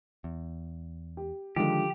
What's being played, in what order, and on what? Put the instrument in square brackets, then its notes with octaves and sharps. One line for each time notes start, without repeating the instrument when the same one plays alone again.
[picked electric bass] E2
[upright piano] G4
[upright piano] D3 F3 [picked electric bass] D#3 G#3 [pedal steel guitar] G4